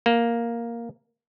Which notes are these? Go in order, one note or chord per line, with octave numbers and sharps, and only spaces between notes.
A#3